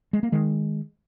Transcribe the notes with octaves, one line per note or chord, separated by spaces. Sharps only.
G#3
A#3
D#3 G#3